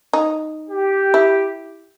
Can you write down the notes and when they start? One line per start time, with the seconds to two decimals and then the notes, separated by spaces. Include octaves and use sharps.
0.13 D#4
0.70 G4
1.14 E4